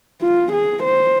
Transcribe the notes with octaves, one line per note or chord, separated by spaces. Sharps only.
F4
G#4
C5